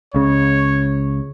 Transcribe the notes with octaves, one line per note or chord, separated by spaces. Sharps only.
C#2 C#3 C#5